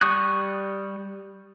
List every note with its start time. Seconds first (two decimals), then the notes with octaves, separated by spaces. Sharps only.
0.01 G3 C#6 D#6 F#6